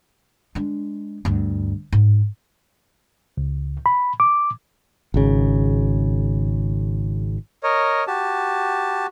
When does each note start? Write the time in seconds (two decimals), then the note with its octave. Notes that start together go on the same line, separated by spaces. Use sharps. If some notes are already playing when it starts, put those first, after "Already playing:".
0.55 G#3 D4
1.25 D2 G2
1.92 G#2
3.37 C#2
3.86 B5
4.20 D6
5.14 G#1 C#3
7.63 A#4 C#5 D#5
8.07 F#4 G4 A5